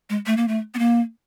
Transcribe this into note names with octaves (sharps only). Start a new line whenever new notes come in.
G#3
A3
A#3
A3
B3
A#3